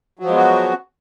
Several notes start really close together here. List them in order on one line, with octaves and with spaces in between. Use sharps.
F#3 F3 G#3 B3 F#4